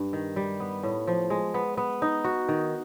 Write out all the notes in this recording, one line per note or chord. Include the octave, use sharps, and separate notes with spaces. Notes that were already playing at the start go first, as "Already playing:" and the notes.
Already playing: G2
D#3
G3
B3
A2
F3
G#3
B3
B3
D#4
F#4
D#3